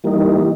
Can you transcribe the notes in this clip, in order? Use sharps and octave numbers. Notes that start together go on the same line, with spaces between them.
E3 G3 A#3 D#4